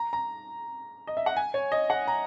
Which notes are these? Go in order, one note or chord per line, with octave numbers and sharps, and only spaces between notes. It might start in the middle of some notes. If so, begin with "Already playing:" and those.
Already playing: A#5
A#5
D#5
E5
F#5
G#5
C#5
D#5
F#5
A#5